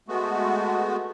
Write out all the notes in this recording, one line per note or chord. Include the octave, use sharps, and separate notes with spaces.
G#3 A3 B3 F#4